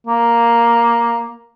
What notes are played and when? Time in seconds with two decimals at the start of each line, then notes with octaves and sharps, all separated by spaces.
0.07 A#3